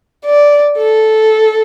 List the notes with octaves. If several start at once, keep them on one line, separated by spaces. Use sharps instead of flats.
D5
A4